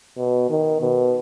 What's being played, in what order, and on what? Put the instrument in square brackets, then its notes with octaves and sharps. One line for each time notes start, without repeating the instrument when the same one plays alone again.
[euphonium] B2
D#3
B2